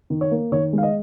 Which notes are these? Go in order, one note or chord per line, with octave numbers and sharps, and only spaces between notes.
D#3
C#5
A#3
D#3 C#5
G#3
F5
D#5